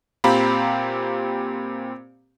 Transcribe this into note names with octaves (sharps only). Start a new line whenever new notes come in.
A#2 C4 G4 F5 A#5 B5